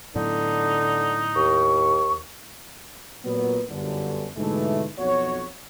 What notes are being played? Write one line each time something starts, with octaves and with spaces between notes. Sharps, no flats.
A2 D3 F#3 B3 D#4
D#2 C#6
A#2 F#3 B3
G1 F#2 D3
G#2 B2 D3 E3 G#3 A3
B1 F2 B2 F#4 C#5